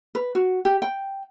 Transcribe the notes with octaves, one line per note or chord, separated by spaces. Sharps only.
B4
F#4
G4
G5